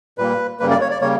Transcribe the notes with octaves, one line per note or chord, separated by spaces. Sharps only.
A#2 G3 A#3 B4
F#2 C#3 G3 A#3 B4
D5
C#5
D5
C#3 G3 A#3 C#5